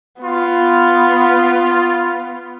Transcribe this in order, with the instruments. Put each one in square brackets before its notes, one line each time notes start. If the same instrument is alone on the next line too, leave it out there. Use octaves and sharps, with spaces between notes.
[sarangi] B3 [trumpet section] F4